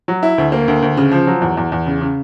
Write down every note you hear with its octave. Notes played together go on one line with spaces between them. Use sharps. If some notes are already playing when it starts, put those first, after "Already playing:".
F#3
E4
D2
A#3
D2
D2
C#3
F3
F#3
E2
E2
E2
C#3
C#3